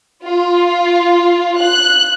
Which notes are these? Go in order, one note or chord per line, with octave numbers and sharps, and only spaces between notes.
F4
F#6